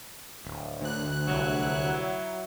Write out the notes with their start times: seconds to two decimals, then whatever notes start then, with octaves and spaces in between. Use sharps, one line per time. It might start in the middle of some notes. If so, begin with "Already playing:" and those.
0.45 D1
0.81 D2 F#6
1.28 C2 F#3 E4